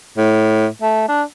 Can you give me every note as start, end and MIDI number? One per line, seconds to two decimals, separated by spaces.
0.17 0.67 45
0.82 1.07 57
1.08 1.23 62